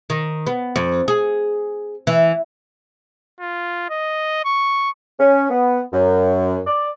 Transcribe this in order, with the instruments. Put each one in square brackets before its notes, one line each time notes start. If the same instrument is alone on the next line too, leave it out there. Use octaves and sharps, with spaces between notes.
[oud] D#3
B3
F2
G#4
E3
[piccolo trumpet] F4
D#5
C#6
[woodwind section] C#4
B3
F#2
D5